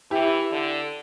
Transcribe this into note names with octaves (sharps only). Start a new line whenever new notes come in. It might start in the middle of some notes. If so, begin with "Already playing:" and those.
E3 E4 G4
D3